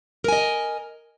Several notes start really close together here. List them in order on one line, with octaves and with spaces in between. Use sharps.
A#4 G#5 D#5